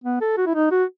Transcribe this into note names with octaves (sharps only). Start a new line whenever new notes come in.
B3
A4
F#4
E4
D#4
F#4